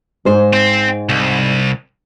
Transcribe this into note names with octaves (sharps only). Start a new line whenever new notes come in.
G#2 C5
C4
C2